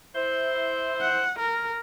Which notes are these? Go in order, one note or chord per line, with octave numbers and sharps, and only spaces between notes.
E4 C5
F#5
A#4